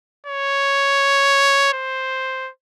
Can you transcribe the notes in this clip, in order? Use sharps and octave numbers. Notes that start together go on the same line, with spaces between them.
C#5
C5